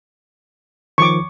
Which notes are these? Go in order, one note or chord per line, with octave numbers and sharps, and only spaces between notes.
D#3 F3 C#6 D6